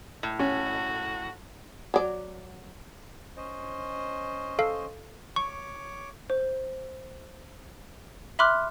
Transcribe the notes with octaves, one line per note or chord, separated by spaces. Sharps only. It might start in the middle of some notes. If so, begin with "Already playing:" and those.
A2
C#4 F#4
F#3 D5
C#4 C5 D#5
A4 F5
C#5 C#6 D6
C5
E5 B5 C6 D6 F6 F#6